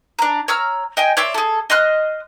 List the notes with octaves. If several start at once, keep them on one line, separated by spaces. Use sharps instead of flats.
D4 A#5
C#5 A#5 E6 F6
D#5 G5 G#5
C#5 D5 E5 C6
G#4 A4
D#5 C6 F6 F#6